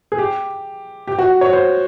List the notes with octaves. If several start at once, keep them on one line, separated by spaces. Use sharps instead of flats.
G#4
G4
G4
F#4
C#5
C5